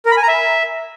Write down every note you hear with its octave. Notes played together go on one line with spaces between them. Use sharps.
A#4
B5
G#5
A#5
E5